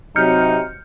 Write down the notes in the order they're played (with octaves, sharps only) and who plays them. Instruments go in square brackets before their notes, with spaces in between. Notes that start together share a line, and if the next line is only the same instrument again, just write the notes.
[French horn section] C3 F#3 [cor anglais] D#4 [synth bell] F6 G6 C#7